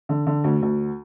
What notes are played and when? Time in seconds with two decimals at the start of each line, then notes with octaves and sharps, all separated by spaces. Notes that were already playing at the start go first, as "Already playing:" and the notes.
0.09 D3
0.27 D3
0.44 D2
0.62 D2